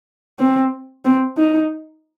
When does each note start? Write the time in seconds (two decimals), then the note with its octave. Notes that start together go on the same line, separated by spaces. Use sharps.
0.39 C4
1.05 C4
1.38 D#4